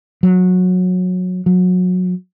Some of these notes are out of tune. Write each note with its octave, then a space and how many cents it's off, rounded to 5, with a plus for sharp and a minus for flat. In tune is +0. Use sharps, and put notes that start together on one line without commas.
F#3 -20
F#3 -25